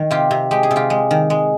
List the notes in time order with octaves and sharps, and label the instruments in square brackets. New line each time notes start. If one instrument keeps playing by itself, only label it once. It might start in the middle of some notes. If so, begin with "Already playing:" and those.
Already playing: [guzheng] D#3
C3 F4 G4
C3
G#3 G4
G#4
C3
F4 G4
G#3
D#3
G#3